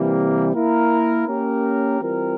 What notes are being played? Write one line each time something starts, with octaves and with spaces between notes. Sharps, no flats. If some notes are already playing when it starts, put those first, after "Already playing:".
Already playing: C3 E3 G3 A#3
A#3 E4 A#4
A#3 C#4 G4 A#4
E3 G3 C4 F4 A#4